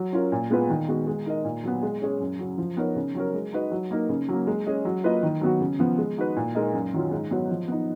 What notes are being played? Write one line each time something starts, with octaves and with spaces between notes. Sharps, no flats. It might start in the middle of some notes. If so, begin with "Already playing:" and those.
Already playing: F#3
C#4 F4 A#4
A#2
G#3 B3 F4 B4
D#3
G#3 B3 F#4
G#3
D#4 A#4 D#5
A#2
F#3 B3
G#3
C#4 G#4 C#5
F#2
C#3 F#3
F3
B3 D#4 A#4 C#5
C#3
F#3 C#4 F#4 A#4
G#3
D#4 F#4 B4 D#5
F#3
A#3 D#4 A#4
C#3
F#3 A#3
G#3
C#4 G#4 D#5
F#3
A#3 F4 B4 D#5
D#3
F#3 B3 F#4
C#3
F3 B3
G#3
D#4 F#4 B4
A#2
G#3 D#4 A#4 D#5
F#2
D#3 F#3 C#4 F4
G#2
F#3 B3 F#4 C#5
F3
B3 D#4